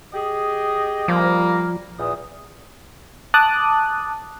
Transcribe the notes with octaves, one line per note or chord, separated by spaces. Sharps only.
G4 G#4 D#5
F3 G3 A#3
E2 A#2 D#6
A5 D6 D#6 F#6